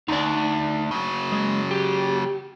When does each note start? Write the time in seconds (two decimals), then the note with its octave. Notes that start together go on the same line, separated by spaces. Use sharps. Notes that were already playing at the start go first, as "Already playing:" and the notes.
0.08 D2 D#4 D5
0.91 C#3 F#3
1.32 G#3
1.71 G4